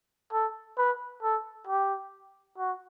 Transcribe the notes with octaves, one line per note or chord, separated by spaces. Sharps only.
A4
B4
A4
G4
F#4